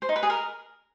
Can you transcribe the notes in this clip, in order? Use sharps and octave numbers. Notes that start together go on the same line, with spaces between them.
C5
D#4
B4
G#4
A#4